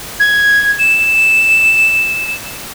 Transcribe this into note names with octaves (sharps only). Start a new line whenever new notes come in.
G#6
E7